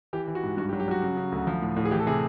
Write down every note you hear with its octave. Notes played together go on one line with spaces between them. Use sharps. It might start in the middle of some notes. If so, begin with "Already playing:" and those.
E3 G4
E3
F#4
G#2
G2 F#4
G4
F#3
G4
F#3 F#4
C#3
C#3
D2
F3
A2
A2
G#4
E3 G4
A4
C3 G#4